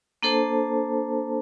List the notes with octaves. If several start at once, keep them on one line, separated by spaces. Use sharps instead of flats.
A#3 D4 A4 C5 A5